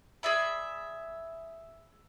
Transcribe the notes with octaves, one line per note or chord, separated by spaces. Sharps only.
G#4 D5 E5 B5